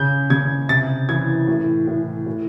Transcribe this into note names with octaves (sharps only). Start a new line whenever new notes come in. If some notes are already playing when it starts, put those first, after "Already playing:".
Already playing: C#3 G6
C#3 G#6
C3 A6
E3 G#6
A2
A2
A2